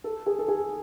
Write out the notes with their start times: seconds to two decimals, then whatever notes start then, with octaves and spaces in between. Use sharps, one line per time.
0.04 A4
0.26 G#4
0.39 A4
0.48 G#4